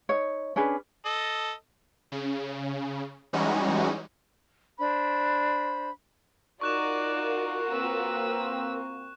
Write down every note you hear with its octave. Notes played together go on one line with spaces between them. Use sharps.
D#4 C#5
C#4 D4 G#4 B4
A4 D#5
C#3
E3 G3 G#3 C#4 D#4 F#4
D4 C5 B5
D#4 F4 F#4 A#4 D5 C#6 F#6 E7
A#3 C4 B4 E6